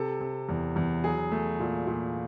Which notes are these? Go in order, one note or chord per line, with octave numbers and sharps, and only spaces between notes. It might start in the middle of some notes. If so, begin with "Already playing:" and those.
Already playing: C3 A4
C3
E2
E2
F#3 G#4
A3
A#2
A#2